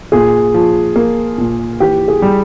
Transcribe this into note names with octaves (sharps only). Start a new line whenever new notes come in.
A#2 G#4
F3
A#3
A#2
E3 G4
G#4
G3